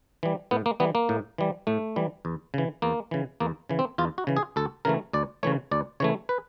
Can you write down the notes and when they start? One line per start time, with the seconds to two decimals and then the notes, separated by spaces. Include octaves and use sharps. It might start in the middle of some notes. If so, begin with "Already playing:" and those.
0.23 E3 G3
0.51 A2 B3
0.66 A#3
0.80 E3 G3 B3
0.95 A#3
1.09 A2
1.38 E3 G3
1.67 A2 A3
1.96 E3 G3
2.25 E2
2.54 C#3 E3
2.82 E2 A#3
3.11 C#3 E3
3.40 E2 A#3
3.69 C#3 E3
3.79 C4
3.98 E2 F4
4.18 F#4
4.27 C#3 E3
4.37 G#4
4.56 D2 A4
4.85 C#3 E3 A3 A#4
5.13 D2 D5
5.43 C#3 E3 A3 C#5
5.71 D2 D5
6.00 C#3 E3 A3 C#5
6.29 B4